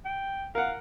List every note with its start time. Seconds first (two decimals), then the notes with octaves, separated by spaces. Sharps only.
0.05 G5
0.55 A#4 F5 F#5